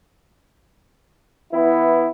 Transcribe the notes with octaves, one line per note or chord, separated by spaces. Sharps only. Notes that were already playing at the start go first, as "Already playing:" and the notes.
E3 B3 E4